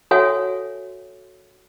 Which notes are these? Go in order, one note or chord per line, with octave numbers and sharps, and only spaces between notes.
F#4 A4 C#5 E5 F#5 G#5